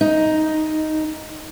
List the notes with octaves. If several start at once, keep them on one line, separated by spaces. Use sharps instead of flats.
D#4